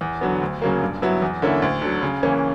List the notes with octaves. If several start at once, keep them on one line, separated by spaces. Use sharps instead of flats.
E2
D3 F#3 B3
D2
C#3 F#3 A#3
G2
F#3 B3 E4
E2
D3 A#3 C#4 E4
D2
D3 F#3
C#3
E3 A#3 C#4